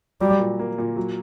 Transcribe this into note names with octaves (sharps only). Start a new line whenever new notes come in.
F#3 G3
A#2
A#3
A#2
F#3